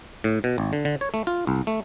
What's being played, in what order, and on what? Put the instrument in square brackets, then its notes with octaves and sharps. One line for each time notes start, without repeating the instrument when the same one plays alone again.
[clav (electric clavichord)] A2
B2
G#1
D3
D3
C#5
A3
F4
C2
A3